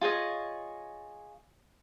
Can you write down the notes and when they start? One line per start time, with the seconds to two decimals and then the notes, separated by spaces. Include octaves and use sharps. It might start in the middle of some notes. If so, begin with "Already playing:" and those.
0.01 F4 G#4 C#5 D#5